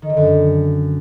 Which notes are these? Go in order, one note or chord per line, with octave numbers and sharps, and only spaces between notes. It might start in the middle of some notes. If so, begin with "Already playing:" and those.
D#3
D3
F#2